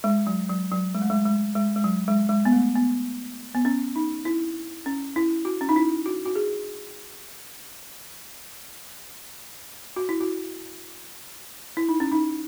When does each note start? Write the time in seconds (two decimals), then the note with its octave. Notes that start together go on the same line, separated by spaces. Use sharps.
0.04 G#3
0.27 F#3
0.49 F#3
0.72 F#3
0.95 G#3
1.02 A3
1.10 G#3
1.25 G#3
1.55 G#3
1.76 G#3
1.84 F#3
2.08 G#3
2.29 G#3
2.45 B3
2.52 A3
2.75 B3
3.55 B3
3.65 C#4
3.96 D#4
4.25 E4
4.86 C#4
5.16 E4
5.45 F#4
5.61 C#4
5.69 D#4
5.76 E4
6.06 F#4
6.26 F#4
6.35 G#4
9.96 F#4
10.09 E4
10.21 F#4
11.77 E4
11.89 D#4
12.00 C#4
12.12 D#4